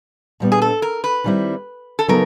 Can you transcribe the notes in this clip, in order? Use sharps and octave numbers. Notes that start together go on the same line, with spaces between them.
A#2 G3 B3 D4
G#4
A4
A#4
B4
D#3 G3 C4 E4
A4
C#3 F#3 B3 D#4 A#4